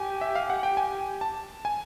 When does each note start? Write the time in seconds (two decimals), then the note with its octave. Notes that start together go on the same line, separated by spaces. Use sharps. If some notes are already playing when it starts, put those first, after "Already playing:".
Already playing: G4 G#5
0.21 E5
0.35 F5
0.50 F#5
0.63 G5
0.77 G#5
1.21 A5
1.65 G#5